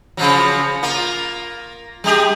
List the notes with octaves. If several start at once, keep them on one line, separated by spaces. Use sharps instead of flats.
C#3 F3 F#3
A#3 F4
G3 G4 G#4